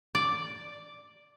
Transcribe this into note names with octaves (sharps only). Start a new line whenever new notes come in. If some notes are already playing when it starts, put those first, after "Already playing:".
D5